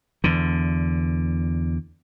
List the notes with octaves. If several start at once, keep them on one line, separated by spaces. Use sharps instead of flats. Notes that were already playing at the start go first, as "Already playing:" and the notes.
E2 D3